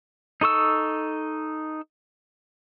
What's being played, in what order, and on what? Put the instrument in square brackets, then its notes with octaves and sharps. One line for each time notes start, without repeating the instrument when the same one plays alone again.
[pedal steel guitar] D#4 A4 C#6 E6